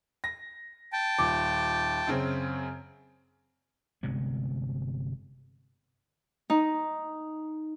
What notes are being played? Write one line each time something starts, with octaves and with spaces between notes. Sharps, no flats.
A#6
G5 A5
D#1 D6
F#2 C#3 C4
G1 C3 G#3 B3
D#4